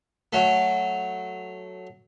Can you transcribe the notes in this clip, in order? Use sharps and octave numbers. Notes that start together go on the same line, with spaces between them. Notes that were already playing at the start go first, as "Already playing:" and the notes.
F#3 A3